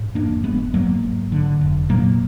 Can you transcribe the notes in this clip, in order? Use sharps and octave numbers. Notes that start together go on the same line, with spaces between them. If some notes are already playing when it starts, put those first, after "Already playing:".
Already playing: G#1 G#2
F2 A#3 D4
F1 G#3 B3
G#2 F#3 A#3
G#1
D3
F1
A#2 F#3 A#3